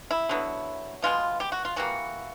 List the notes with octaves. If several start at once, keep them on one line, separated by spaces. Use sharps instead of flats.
E4
D3 F#3 B3
B2 G#3 B3 F4
G4
F#4
F4
E3 G3 A#3 F#4